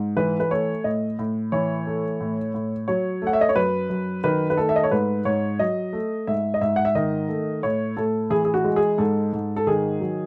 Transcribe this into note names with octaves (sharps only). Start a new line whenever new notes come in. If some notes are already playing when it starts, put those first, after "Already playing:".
Already playing: G#2
E3 B4
B4
A3 C#5
A2 D#5
A2
E3 C#5
A3
A2
A2
F#3 C#5
A3 F#5
E5
D#5
C#5
F#2 B4
F#2
D#3 B4
B4
A3 A4
E5
D#5
C#5
G#2 B4
G#2 C#5
F#3 D#5
A3
G#2 E5
D#5
G#2 E5
F#5
E5
D#3 D#5
A3
A2 C#5
A2 A4
E3 G#4
G#4
F#4
G#3
G#4
G#2 A4
G#2
A4
D#3 G#4
F#3